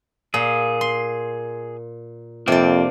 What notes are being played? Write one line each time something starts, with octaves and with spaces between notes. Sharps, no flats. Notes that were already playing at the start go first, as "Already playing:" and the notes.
A#2 G#4
C6
F2 C3 A#3 C4 D4 D5